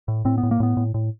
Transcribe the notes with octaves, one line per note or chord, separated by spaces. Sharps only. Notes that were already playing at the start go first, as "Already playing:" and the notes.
A2
A2 C4
B3
A2
A#3
A2 B3
A2
A2